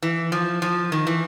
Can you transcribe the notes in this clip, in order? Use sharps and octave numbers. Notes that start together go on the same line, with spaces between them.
E3
F3
F3
D#3
E3